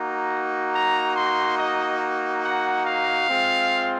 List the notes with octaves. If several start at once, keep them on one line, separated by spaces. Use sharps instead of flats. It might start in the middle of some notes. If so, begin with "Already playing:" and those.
Already playing: A#3 D#4 F#4
A#5
C6
D#5
F#5
F5
G#3 C4 F4